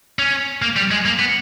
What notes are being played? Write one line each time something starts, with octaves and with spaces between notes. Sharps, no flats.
C#4
A#3
G3
G#3
A#3
B3